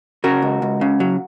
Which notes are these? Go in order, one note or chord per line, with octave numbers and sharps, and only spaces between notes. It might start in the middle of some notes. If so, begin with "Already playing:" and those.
C#3 F#4 A#4
C#2
C#2
C#3
F#3